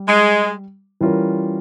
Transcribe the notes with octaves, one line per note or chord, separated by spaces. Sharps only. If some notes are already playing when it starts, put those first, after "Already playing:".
Already playing: G3
G#3
E3 G3 C#4 F4 A#4